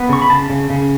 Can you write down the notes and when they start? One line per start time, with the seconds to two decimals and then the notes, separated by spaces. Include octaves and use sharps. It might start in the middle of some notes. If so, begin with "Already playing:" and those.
Already playing: B3
0.09 C#3 C#6
0.22 B5
0.30 C#3 A5
0.50 C#3
0.70 C#3